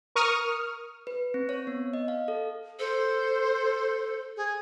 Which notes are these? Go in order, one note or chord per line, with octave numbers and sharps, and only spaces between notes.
A#4 C#6 D#6 F6
B4
C4
C#5
B3
D#5
F5
A4
A4 C5
G#4